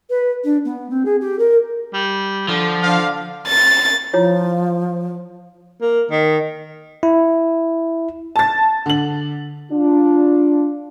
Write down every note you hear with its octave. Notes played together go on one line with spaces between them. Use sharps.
B4
D4
B3
C4
G#4
G4
A#4
G3
D3 F3
D4 C5 F5
A6
F3 E4 F4 C#5
A#3
D#3
E4
A5 A6
D3 F#7
D4 F4